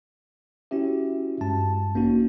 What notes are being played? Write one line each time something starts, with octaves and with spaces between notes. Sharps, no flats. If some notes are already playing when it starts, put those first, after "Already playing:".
C#4 E4 F#4 G4 E5
G2 G#3 A5
A1 A#3 C#4 D#4 F#4